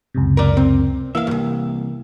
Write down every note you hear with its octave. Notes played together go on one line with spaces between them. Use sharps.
C#2 F#2 C3
A#4 D5
C4
E3 A#3 E5 F5
C2 F#2